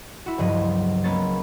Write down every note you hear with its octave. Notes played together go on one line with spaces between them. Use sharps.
E4 F#4
C#2 G2 F3 F#3 D#5
G#3 A#3 B3 C#4 A6